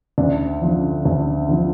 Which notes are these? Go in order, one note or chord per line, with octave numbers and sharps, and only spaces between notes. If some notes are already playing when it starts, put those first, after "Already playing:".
D2 D4
D3 F3
D2
D3 F3